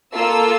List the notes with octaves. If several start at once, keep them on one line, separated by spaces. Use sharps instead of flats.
A#3 F4 A4 E6